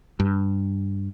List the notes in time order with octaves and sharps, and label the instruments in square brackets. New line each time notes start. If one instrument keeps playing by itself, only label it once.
[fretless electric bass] G2